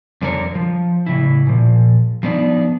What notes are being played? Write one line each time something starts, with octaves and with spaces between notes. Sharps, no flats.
F2 D3 D4 A#4 C#5
F3
A2 C#3 E4
A#2 F3
F3 B3 D4 D#4